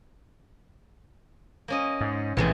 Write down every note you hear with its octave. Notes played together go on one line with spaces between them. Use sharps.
A#3 C#4 D#5
G#2
A#1 A2 C3 E3 G#3 A3